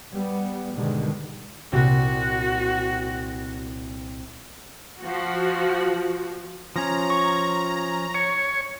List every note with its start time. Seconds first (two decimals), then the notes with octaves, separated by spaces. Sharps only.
0.12 G3 B3
0.75 G#2 B2 D3 D#3 G3 G#3
1.72 C2 A#2 F#4 A#6
5.00 F3 F#4
6.76 F3 C#4 A#5
7.10 C#6
8.14 C#5